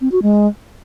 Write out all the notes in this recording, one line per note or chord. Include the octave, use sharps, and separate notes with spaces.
C4
F#4
G#3